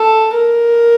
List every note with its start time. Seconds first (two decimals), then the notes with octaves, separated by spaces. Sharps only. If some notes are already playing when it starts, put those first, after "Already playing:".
Already playing: A4
0.34 A#4